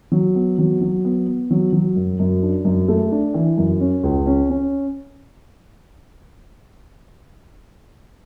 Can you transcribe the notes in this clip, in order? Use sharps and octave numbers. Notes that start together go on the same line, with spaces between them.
F#3
B3
F#3
F#3
B3
B3
F#3
F#3
F#2
F#2
D4
F#2
A3
D4
E3
F#2
C#4
C#2
C#4
C#4